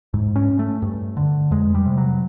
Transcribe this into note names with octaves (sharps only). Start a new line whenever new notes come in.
G#2
C#4
A3
G2
D3
F2 G#3
G3
C3
F#3